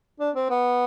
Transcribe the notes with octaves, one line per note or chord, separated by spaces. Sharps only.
D4
C4
B3